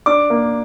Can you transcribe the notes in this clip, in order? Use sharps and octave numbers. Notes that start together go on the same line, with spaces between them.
D4 D6
A#3